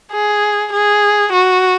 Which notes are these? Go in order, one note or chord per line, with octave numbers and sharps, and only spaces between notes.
G#4
G#4
F#4